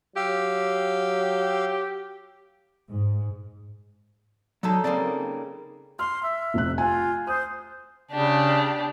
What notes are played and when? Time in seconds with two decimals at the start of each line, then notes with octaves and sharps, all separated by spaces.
0.16 F#3 G4 F5 E6
2.89 G#2
4.63 F#3 G#3 D#4 A4 A5
4.84 C#3 G3 A#3 C4 D5
5.99 C6 F6
6.23 E5
6.54 F1 C3 F#6
6.78 F4 G#5
7.27 C5 D#6
8.11 C#3 D4 G4